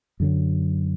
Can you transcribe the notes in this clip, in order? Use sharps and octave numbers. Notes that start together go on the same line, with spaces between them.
F#2 D3 F#3